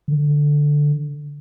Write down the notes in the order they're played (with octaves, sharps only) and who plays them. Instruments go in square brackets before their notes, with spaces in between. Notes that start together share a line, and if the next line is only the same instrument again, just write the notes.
[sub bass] D3